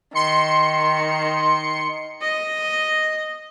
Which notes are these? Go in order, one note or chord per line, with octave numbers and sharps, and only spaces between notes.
D#3 C6 C#7
D#5